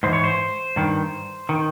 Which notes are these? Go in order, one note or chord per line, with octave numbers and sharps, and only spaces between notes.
G#2 E3 C5
C#5
C5
G2 D#3
D#3